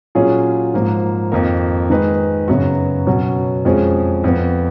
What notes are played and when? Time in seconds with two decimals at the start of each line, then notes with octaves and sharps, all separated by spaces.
0.15 A#2 F#3 C#4 F4 G#4
0.74 G#2 F3 A#3
1.32 F2 D#3 A#3 D#4 A#4
1.90 D#3 G#3 D#4 G#4 B4
2.48 F#2 C#3 F#3 B3 F#4
3.07 B2 F#3 C#4
3.65 F2 F3 G#3 C#4 G#4
4.24 F2 F3 B3